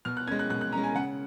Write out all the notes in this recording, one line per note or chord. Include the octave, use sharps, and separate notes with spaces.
B2 F6
F#6
G#3 C#4 G#6
F#6
B2 F#6
F#6
G#3 C#4 A#5
G#5
C#3 F#5